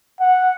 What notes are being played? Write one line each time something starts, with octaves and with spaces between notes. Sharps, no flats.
F#5